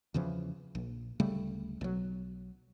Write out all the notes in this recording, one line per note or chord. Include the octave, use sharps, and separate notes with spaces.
E2 C#3 E3 F3
A#1
D1 C#3 G3 A3
B1 F#3